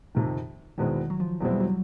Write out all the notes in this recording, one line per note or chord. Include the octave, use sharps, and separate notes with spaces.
F2 C3 D#3
E2 B2 D#3 G#3 C4 E4
F#3
F3
E2 B2 F#3 G#3 C4 E4
G3
F#3